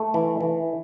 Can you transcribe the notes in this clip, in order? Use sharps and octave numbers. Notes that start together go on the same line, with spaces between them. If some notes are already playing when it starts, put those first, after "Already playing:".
Already playing: A3
E3
E3